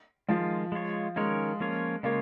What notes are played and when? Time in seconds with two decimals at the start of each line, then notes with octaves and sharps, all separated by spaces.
0.28 D#3 F3 G#3 F4
0.72 G#3 F4 C#5
1.16 D#3 G#3 C#4 A#4 C#5
1.60 F3 A#3 C#4 F4 C#5
2.03 C#3 G#3 A#3 F4 C#5